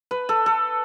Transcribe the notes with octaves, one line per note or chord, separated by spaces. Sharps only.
B4
A4
A4